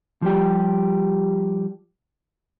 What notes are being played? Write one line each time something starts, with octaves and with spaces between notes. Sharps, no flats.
F3 G3 G4